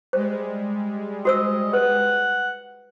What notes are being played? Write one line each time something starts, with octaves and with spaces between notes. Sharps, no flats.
G3 G#3 C5
F#4 C5 D#5 E6
B4 F#5